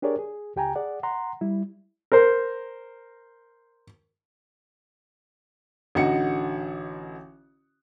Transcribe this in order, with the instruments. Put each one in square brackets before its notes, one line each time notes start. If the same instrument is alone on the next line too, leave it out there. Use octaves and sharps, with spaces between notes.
[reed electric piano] D4 G4 G#4 A#4 C#5 D5
G#4
C#2 G4 G5 G#5 A#5
G#4 D5 F#5
F#5 A#5 C6
G3 E4
[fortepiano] A#4 C5
[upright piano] A1 D3 D#4 F#4 C#7